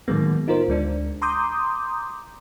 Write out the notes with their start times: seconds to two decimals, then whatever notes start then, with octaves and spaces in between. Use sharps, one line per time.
0.08 A2 D#3 F#3 G#3 A#3 B3
0.48 D#4 F4 A#4 C5
0.68 D2 G#3 D4
1.22 A#5 C6 D6 D#6 G6